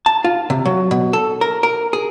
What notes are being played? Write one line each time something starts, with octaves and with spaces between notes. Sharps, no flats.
A5
F4
C3
F#3
B2
A4
A#4
A#4
G#4